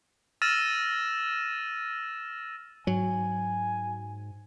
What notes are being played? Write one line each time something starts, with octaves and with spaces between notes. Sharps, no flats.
E6 F6 A6 A#6 D#7 E7
G#2 F#3 G#5